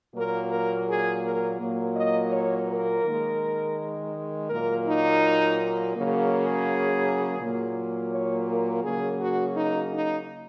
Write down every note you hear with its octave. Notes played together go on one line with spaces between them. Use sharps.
A#2 F#3 A#3 A#4
A#4
G#4
A#4
A#2 F#3 A#3
D#5
C#5
A#4
D#3 G#3
A#2 F#3 A#3 A#4
D#4
C#3 F#3 A#3
G#4
A#2 F#3 A#3
C#5
A#4
C#3 F#3 A#3 G#4
F#4
D#4
D#4